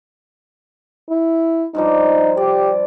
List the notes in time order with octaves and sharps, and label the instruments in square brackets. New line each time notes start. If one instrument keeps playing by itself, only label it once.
[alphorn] E4
[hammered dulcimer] G2 F3 G3 [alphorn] D#4
[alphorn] G4 [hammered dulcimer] D5